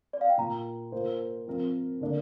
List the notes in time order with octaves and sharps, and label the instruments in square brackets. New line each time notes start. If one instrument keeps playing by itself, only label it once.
[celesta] D5
F5
G5
[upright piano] A#2 A#3 F4 [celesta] A#5
[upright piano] A#3 F4 C5
F3 C4 A#4
D3 A#3 D4